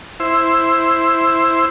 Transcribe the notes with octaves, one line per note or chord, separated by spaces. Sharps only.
E4 C5